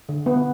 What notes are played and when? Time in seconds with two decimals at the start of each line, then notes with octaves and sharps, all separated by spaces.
0.09 D3
0.26 B3